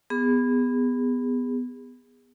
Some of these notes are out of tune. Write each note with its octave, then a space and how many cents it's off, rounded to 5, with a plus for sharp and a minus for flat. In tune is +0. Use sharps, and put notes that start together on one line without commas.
B3 +10 G#4 -30